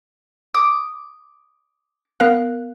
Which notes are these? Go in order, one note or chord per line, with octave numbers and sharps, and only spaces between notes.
D6 D#6
B3 A#4 F5 F#6